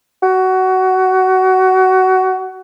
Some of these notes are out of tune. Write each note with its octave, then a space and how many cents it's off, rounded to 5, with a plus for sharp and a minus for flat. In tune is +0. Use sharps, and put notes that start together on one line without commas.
F#4 +20